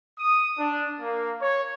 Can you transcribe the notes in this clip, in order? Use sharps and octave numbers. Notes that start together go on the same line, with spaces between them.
D#6
D4
A#3
C#5